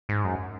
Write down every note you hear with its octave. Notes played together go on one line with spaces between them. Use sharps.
G#2
F#2